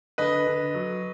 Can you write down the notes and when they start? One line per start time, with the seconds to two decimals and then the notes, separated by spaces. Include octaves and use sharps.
0.18 D3 B4 D#5
0.47 D3
0.74 F#3